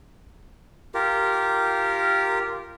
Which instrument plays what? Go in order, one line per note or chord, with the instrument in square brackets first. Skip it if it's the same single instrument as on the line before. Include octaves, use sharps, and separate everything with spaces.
[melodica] F4 G4 A#4